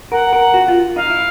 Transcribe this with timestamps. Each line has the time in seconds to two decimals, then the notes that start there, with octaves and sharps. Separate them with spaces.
0.11 A#4 F#5
0.33 A#4
0.54 F#4
0.68 F4
0.96 D#4 F5
1.10 E4